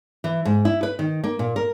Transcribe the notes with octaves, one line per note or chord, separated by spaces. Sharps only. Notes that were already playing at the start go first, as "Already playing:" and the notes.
E3
G#2
E4
B4
D#3
A#3
A#2
A#4